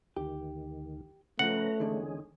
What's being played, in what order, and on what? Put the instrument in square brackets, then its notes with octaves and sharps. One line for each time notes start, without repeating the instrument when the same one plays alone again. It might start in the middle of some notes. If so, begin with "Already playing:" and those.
[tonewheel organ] D2 D#3 [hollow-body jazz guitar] G4
[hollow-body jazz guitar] C#3 F3 [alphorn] A3 [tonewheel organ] C#4 B4 A#5 [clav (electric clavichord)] F#5
[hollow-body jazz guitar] E2 D3 D#3 [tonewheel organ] G#3 C#4 G#4